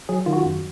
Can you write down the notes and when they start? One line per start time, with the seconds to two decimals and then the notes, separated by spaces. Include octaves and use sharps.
0.09 F#3 G#4
0.26 D#3 F4
0.33 F#4
0.45 F#2